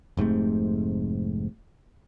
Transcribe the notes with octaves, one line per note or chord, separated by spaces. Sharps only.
F1 G#2 C3 A3